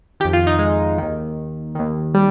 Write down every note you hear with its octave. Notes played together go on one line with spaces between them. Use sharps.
F2 D#3 G4
F4
D#4
G#3
D#2 D#3
D#2 D#3
G3